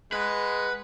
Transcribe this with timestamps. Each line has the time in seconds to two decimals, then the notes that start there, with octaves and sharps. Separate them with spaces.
0.12 G#3 B4 F#5